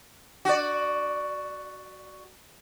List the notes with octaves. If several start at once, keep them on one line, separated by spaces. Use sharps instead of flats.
F#4 D5